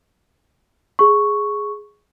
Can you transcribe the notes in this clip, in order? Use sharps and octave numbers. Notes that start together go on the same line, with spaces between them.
G#4 C#6